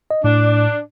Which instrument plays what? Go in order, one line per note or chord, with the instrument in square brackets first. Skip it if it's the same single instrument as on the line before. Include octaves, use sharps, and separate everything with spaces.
[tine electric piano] D#5
[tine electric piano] A2 [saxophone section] D4